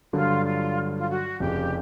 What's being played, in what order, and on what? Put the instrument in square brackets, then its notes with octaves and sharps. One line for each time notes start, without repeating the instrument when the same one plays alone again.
[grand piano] G2 D3 F#3 [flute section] F4
[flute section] F4
F4
F#4
[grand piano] F1 F2 C#3 [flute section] G4